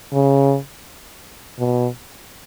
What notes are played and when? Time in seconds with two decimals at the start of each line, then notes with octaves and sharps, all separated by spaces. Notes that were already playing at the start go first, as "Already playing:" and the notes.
0.13 C#3
1.59 B2